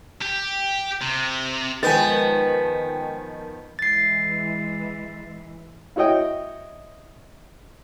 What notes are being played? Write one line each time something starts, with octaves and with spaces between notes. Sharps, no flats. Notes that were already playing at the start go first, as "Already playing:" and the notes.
G4
C3
D#3 F3 G#3 B3 G5 G#5 A6 B6
E3 G#3 A6 C7
E4 F#4 C#5 D#5 G5